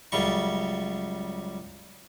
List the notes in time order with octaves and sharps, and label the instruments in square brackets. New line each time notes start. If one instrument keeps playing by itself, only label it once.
[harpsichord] C#2 F#2 C#3 G3 C#6